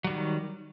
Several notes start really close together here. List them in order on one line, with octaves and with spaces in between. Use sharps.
F#3 G3 D#3